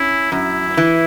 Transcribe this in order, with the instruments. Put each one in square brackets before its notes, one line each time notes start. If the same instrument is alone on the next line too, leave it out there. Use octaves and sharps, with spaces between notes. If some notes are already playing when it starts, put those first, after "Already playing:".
Already playing: [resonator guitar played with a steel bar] C#4 [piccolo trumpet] E4
[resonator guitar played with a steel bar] F#2 [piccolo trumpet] E4
[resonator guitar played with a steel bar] E3